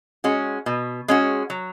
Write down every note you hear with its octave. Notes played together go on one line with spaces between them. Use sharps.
G#3 C#4 F#4
B2
G#3 C#4 F#4
F#3